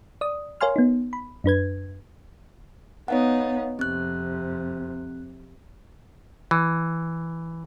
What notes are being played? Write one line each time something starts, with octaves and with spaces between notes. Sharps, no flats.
D5 D#6
A#4 C#5 F5 G#5 C6 F6
B3 D#4
B5
F#2 D4 B4 G#6
B3 D#4 C#5 F5 F#5
F2 C3 C4 F#6
E3